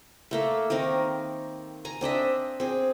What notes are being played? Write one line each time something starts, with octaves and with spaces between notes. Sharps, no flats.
A3 A#3 E5
D#3 A#3 C4 A#4
G#5 A#5
C4 D4 D#5 E5
C4 G#4